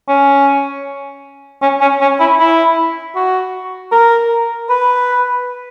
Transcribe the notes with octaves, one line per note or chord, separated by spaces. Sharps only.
C#4
C#4
C#4
C#4
E4
E4
F#4
A#4
B4